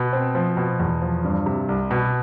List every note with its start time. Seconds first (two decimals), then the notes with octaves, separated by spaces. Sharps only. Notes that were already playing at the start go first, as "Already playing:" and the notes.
Already playing: B2
0.13 C4
0.35 F3
0.57 B2
0.80 E2
1.02 F3
1.24 G2
1.46 C3
1.69 C2
1.91 B2